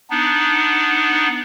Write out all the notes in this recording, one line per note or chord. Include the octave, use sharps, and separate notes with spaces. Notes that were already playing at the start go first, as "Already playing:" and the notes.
B3 D4 D#4